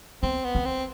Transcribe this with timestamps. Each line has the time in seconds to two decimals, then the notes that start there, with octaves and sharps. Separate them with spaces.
0.23 B3 C4
0.44 B3
0.55 C4
0.65 C4